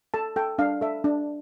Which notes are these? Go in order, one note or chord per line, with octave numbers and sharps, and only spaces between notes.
A4 A5
A4 G5
D4 F5
A4 E5
D4